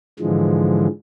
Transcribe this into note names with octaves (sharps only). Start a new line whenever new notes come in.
G#2 D3 E3 F3 G#3